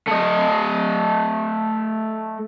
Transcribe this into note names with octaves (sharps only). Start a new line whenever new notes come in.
A3 D#5